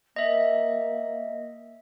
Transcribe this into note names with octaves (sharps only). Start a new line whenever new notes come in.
A#3 D#5 E5